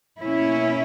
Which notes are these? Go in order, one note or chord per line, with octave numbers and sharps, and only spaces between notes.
B2 A#3 C#4 E4